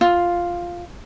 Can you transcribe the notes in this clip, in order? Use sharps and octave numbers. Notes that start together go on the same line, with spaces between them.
F4